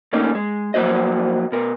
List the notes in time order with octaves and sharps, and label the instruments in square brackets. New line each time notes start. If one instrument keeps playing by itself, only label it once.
[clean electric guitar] A#2 A3 A#3 C#4 D#4
G#3
F3 F#3 A#3 F#4 C5 D#5
B2 A#4